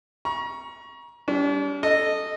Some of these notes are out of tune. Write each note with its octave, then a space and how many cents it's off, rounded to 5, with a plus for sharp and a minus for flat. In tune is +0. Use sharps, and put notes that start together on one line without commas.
A#5 +35 C#6 +5
G3 +0 D4 -45
A4 +0 D#5 -10